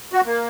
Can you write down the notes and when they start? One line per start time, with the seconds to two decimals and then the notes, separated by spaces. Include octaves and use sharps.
0.13 F#4
0.26 A#3